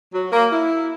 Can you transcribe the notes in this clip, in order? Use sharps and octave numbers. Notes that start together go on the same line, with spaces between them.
F#3
A#3
E4